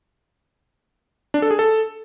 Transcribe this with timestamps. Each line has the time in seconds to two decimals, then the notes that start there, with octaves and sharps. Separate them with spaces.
1.34 D4
1.42 A4
1.51 G#4
1.59 A4